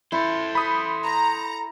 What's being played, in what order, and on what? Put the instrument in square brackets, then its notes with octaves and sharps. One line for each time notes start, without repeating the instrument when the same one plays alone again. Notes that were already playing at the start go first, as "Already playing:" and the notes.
[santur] E4 [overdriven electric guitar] A4 C5
[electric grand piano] B5 D#6
[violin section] A#5